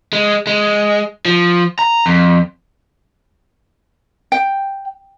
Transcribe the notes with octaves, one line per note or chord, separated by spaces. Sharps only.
G#3
G#3
F3
A#5
F2
G5